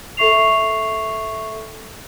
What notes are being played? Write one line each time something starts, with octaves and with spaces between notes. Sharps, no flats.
A4 E5 C#6 C7 F7